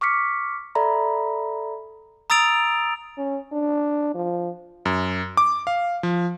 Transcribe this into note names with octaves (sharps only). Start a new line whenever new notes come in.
C#6 D6 F6 B6 C#7
A4 D5 E5 A#5 B5
A#5 D#6 E6 A6 D7 F7
C#4
D4
F3
F#2
D6
F5
F3